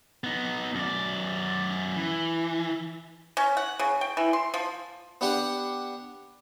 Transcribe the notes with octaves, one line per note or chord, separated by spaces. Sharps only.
B3 D#4
F#2 D5
E3
C#4
F#5
C#3
G5
E3
C6
F3
B3 D4 G4 F#5